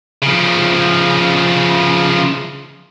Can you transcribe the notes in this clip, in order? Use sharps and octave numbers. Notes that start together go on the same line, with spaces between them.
C#3 F3